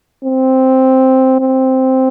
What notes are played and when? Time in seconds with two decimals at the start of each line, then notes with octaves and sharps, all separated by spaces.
0.24 C4
1.40 C4